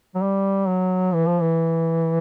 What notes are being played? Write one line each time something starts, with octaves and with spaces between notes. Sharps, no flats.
F#3
G3
F#3
E3
F3
E3